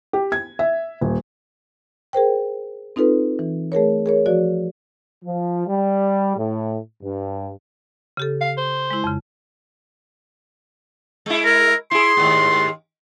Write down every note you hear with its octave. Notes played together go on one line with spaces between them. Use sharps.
G4
G#6
E5
D#1
G#4 A#4 C5 G5
C4 D#4 F4 A4 B4
E3
A3 G#4 A#4 C#5
G#4 A#4 C#5
F3 F#4 D5
F3
G3
A2
G2
C#3 G4 A4
F5
C5
G#3 E4
F2 C#3
G#3 E4
A#4
E4 G#4 C6
D#2 G#2